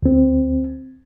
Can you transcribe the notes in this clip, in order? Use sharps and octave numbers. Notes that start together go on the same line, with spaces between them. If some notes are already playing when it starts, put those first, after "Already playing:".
D2 C4